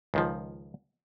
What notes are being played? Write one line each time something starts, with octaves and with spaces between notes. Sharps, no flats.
C#2 D#3 F3